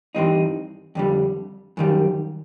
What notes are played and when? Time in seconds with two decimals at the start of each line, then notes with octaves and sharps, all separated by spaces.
0.15 G2 E3 G3 C4 D#4
0.95 F2 D3 G3
1.77 F#2 D#3 G3